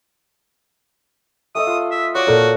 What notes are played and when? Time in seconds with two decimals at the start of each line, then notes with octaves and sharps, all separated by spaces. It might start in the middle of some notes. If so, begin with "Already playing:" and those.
1.55 A3 A4 D#5 D#6
1.67 F4
1.91 E5
2.15 F#4 C#5 D5
2.27 A#2 A4 A#4 D5